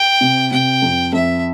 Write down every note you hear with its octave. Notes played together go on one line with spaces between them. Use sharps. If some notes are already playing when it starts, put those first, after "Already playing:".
Already playing: G5
C3
C3 G5
F2
F2 E5